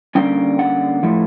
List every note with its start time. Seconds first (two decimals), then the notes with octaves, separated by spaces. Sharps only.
0.15 D3 G3 A#3 C#4 G5
0.59 F#5
1.03 A2 F3 A3